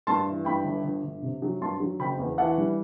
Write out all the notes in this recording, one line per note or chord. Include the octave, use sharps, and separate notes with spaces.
G2 A5 C6
E3
G2 G5 B5
G1
G1
G1
C3
F#3
G2 A5 C6
F#3
F#1 G5 B5
E2
E3 F#5 A5
G3